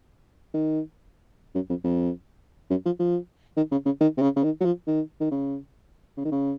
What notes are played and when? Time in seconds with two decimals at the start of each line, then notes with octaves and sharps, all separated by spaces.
0.54 D#3
1.55 F#2
1.69 F2
1.84 F2
2.70 F#2
2.86 F3
2.99 F3
3.57 D#3
3.71 C#3
3.86 C#3
4.01 D#3
4.17 C3
4.22 C#3
4.36 C#3
4.44 D#3
4.60 F#3
4.65 F3
4.87 D#3
5.21 D#3
5.31 C#3
6.17 C#3
6.25 D#3
6.32 C#3